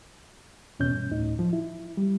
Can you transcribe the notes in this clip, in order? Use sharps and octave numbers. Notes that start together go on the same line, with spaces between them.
E2 B2 C#4 G6
G2
D2 A2 D#4
F3
E4
G3